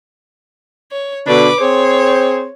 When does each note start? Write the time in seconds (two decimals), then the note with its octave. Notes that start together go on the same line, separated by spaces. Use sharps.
0.92 C#5
1.27 B2 D3 D4 B4 D6
1.60 C4 G#4 C5 C#5